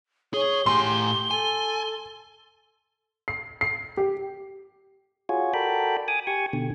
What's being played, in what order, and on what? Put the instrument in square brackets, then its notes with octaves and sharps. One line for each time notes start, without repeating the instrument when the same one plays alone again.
[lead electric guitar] G#4 [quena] C#5 [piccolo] G7
[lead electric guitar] A2 G#5 [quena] G4 [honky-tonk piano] C6
[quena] A4 [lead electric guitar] G#5
[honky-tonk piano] C7
C7
G4
[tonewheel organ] F4 F#4 G#4 C#5
F#4 A4 A#4 D5 G5 B5
G#5 D6 D#6
G4 G#5 C#6
B2 D3